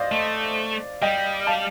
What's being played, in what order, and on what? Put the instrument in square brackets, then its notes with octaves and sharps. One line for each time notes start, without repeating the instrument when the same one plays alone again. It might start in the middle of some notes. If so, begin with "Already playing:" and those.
Already playing: [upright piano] C5 D5 D#5 F5
[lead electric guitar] A3
[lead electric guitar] G3 [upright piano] D#5 G5
[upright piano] F5 A5